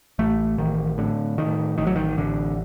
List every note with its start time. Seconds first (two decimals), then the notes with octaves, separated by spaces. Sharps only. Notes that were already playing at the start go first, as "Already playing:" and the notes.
0.19 A1 A3
0.58 A1 D#3
0.98 A2 D3
1.38 A2 D#3
1.78 A1 D#3
1.87 F#3
1.96 D#3
2.18 A1 D3